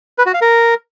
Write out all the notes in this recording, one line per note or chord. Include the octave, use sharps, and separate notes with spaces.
B4
F#4
F5
A#4